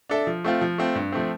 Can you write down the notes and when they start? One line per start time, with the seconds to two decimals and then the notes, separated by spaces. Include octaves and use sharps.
0.10 D4 A4 E5
0.27 F3
0.44 A3 C4 F4
0.61 F3
0.78 A3 C4 F4
0.95 G2
1.12 F3 A3 C4